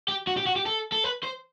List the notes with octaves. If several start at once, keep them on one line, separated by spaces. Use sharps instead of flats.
G4
F#4
G4
F#4
G4
A4
A4
B4
C5